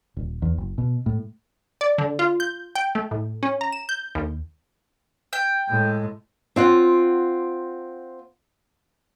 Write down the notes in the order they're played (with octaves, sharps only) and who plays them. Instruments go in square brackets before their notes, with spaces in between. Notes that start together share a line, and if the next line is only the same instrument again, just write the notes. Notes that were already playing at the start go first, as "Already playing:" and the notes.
[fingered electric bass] D#1
E2
F#1
B2
A2
[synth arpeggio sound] D5
D3
F4
G6
G5
A3
A2
C#4
A#5
E7
G6
D#2
[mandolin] G5
[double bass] A2 G#3
[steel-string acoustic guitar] C4 F4 F#5